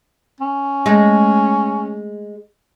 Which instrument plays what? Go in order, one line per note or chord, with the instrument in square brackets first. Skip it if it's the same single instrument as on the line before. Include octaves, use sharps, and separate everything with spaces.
[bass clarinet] C#4
[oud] G#3 A3